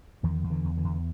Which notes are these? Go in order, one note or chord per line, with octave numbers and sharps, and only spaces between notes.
E2 D#3 F3
E2
D3 E3
E2
D3 E3
E2